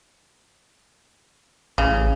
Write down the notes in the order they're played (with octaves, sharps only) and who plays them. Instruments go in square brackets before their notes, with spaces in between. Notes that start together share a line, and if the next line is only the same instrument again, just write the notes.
[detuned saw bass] A1 [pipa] C#3